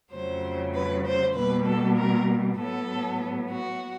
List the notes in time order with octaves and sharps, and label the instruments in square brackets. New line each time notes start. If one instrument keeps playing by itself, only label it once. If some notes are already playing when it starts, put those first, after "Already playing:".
[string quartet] F2 C#3 F#3 A3 C5
B4
C5
B2 G3 A#3 B4
A4
A#4
A2 F#3 B3 A4
F#4